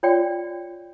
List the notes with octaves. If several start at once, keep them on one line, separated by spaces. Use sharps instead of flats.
F4 C#5 D5 G5